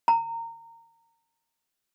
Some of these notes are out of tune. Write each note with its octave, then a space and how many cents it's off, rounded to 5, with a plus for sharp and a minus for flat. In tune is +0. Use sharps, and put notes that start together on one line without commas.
A#5 -20